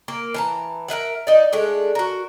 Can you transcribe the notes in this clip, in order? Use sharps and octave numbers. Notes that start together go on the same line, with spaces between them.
A#3
E3 A5 A#5
A#4 B4 E5 F#5
D#4 D5
G#3 A3 D4
F#4 A#4